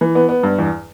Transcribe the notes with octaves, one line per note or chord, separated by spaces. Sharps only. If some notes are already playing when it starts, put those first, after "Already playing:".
E3
B3
B3
G2
E2